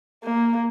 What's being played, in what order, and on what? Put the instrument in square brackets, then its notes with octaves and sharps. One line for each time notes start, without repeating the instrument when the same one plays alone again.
[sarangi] A#3